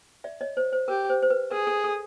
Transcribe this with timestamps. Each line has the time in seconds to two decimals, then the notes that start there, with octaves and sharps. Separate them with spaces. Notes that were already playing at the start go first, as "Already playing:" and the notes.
0.24 D5 E5
0.41 C#5 D#5
0.57 C5
0.73 C5
0.88 G4 A#4
1.10 C5
1.22 C5
1.30 B4
1.51 G#4 A#4
1.67 A4
1.84 A4